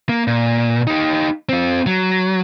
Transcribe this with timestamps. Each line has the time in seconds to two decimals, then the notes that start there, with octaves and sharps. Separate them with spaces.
0.09 A#3
0.27 A#2
0.87 D#4 G4
1.49 C4 F4
1.86 F#3